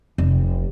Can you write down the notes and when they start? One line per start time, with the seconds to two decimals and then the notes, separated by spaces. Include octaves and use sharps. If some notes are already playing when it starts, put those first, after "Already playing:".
0.18 F1